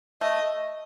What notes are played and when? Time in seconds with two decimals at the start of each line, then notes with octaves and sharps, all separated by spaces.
0.21 A3 D#5